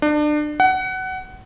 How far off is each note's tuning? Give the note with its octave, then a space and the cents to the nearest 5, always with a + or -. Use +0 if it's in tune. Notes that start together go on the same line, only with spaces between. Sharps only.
D4 +30
F#5 +20